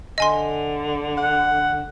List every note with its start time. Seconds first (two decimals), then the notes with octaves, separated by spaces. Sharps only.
0.18 D3 D#5 G#5 C6
1.18 F#5